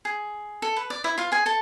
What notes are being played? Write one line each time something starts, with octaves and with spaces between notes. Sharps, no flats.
G#4
A4
B4
D5
E4 E5
F4 F5
G#4 G#5
A4 A5